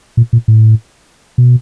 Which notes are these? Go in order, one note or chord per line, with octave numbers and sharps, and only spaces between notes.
A#2
A#2
A2
B2